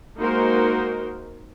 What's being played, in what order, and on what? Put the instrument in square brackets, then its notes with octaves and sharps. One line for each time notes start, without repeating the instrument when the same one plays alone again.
[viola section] G#3 A#3 D#4 F#4 A#4 C5